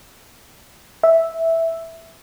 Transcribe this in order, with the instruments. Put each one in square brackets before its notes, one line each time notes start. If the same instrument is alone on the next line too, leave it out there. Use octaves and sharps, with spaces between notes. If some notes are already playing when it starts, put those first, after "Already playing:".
[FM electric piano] E5